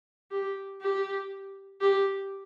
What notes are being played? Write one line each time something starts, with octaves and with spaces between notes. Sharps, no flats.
G4
G4
G4